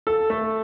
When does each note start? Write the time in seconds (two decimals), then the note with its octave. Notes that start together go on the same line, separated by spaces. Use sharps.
0.07 A4
0.30 A3